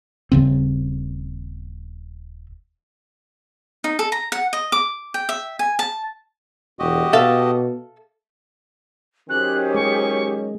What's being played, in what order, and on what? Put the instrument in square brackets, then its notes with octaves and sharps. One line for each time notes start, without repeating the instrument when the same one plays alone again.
[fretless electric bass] D#1 C#3 C4
[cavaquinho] D#4
A4
A#5
F#5
D#5
D6
G5
E5
G#5
A5
[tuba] E1 [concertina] F#4 G4 D#5
[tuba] B2 [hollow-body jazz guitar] A4 E5 F5
[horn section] D#3 F#3 C#4 [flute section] G4 G#4 C5 [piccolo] F#6
[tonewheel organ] G#3 [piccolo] C#6